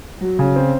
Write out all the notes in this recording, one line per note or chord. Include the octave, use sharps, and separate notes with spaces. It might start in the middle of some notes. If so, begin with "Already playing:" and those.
F#3
C#3
C4